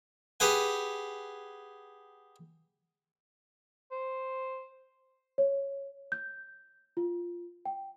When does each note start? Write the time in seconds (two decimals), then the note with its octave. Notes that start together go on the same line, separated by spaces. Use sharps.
0.40 G4 G#4 B4 F#5 G#5
3.91 C5
5.38 C#5
6.12 G6
6.97 F4
7.65 G5